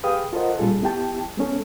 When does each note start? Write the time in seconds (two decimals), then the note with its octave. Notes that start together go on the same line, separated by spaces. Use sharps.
0.03 G4 G#4 B4 F5 G5 D#6
0.33 F4 A4 A#4 C5 D#5 F#5
0.58 A#2 G3 C#4 F4 G#4 A4
0.82 B3 E4 G4 G5 A5
1.37 G#3 B3 C#4 A4